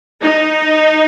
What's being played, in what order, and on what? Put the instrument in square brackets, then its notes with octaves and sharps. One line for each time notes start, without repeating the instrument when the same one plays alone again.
[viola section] D#4